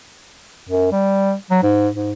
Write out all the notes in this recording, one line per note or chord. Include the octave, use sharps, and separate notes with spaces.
F#2
G3
F#3
G#2
G#2